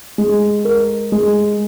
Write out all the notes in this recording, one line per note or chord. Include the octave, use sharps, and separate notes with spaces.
G#3
A#4
G#3